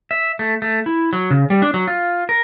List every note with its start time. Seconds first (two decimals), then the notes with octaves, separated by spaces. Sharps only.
0.11 E5
0.39 A3
0.62 A3
0.86 E4
1.13 F#3
1.30 C#3
1.50 G3
1.62 D4
1.74 F#3
1.87 F4
2.29 A#4